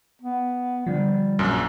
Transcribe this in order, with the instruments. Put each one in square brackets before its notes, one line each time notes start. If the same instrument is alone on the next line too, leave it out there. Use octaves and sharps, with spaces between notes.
[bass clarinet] B3
[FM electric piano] D3 F3 [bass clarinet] G3
[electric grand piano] A#1 F#2